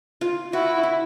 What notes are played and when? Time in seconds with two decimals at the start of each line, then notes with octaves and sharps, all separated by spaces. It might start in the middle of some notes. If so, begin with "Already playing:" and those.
0.21 F4
0.53 E4 F#4
0.83 E4